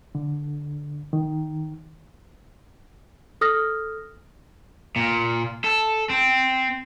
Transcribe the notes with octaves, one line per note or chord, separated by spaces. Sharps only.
D3
D#3
A4 D#6 F6 A#6
A#2
A4
C4